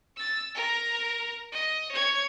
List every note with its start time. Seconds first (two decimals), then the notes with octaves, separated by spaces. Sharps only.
0.16 E6 A6
0.55 A#4 A#5
1.52 D#5
1.91 C#5 G#6